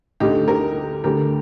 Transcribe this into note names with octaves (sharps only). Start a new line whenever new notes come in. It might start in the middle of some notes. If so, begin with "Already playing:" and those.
D2 D3 D#4 G4
G4 A#4
D2 D3 G4 A#4